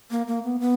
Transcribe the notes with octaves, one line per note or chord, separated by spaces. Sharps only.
A#3
A#3
B3
B3